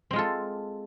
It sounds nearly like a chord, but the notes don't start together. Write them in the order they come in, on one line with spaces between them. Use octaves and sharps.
C4 G#3 F4 A4